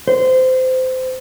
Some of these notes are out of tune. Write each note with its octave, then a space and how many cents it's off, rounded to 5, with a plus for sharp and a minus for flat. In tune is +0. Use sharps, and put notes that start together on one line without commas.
C5 -20